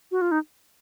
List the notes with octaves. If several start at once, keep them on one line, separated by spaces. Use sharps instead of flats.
F#4
F4
D#4